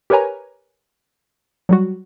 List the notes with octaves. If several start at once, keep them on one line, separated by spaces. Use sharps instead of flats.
G4 A#4 B4 C#5 G#5 A#5
F#3 G3 F#4